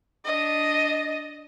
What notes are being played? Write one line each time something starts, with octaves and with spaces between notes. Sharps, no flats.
D4 D#5